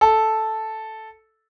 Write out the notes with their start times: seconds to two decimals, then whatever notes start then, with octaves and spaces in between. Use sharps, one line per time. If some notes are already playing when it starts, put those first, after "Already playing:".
0.01 A4